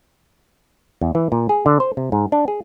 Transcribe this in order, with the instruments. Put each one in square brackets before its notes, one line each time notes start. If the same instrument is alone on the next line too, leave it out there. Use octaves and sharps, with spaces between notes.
[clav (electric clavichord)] E2
E3
A#2
G#4
D3
C5
C3
G#2
D4
G#4